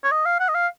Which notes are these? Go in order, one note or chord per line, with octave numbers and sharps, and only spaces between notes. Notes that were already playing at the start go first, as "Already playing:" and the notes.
C#5
D#5
F5
F#5
D#5
F5